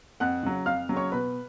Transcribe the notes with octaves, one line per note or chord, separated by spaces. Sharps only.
F2 F#5 F#6
C#3 F#3
F2 F5 F6
C#3 F#3
C#5 C#6
B2 B4 B5